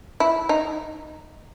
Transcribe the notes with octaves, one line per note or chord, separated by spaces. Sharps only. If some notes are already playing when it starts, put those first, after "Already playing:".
E4
D#4